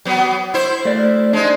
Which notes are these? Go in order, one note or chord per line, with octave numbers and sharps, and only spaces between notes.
F#3 B3
E4 C5
A3 D5
G#3 D4 D#4